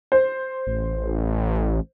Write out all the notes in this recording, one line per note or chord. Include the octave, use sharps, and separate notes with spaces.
C5
A1